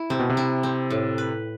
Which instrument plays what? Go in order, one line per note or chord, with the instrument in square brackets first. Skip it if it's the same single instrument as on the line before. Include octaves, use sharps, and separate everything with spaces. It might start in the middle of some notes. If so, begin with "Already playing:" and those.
Already playing: [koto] E4
[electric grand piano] C3 [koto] C4
[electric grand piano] B2
C3
[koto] E4
C4
A2
B4